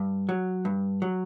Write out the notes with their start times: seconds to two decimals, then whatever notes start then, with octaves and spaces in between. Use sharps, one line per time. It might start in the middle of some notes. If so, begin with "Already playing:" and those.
Already playing: G2
0.29 F#3
0.65 G2
1.02 F#3